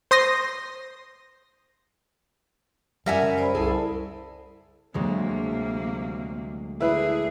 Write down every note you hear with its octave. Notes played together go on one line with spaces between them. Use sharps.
C5 C6 D#6 A#6
F#2 G3 A#4 E5 F#5 G#5
C#3
C5 D5 B5
C2 G#4 A4
D2 C3 F#3 G#3 A#3
D3 E4 G#4 B4